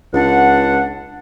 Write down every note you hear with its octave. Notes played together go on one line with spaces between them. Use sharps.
C#2 D4 F#5